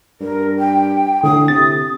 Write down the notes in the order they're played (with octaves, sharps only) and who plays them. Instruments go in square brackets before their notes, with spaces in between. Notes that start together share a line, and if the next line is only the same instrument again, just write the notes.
[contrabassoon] G2 [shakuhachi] A#4
[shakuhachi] G5
[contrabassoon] A2 [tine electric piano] D3 [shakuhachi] D#6
[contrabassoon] C3 [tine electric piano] A6